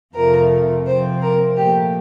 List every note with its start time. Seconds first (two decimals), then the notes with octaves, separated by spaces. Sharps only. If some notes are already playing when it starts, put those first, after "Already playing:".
0.14 F2 C3 F3 A3 A#4
0.86 C3 F3 C4 C5
1.21 A#4
1.57 A#2 F3 A3 G4